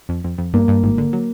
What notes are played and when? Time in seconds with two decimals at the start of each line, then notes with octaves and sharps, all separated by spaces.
0.09 F2
0.24 F2
0.38 F2
0.53 G2 A#3
0.68 G2
0.83 G#1
0.98 D3
1.13 F#3